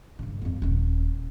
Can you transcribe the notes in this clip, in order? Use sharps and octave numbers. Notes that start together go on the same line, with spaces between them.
G2 C#3
F2 A#3
D#1 C#4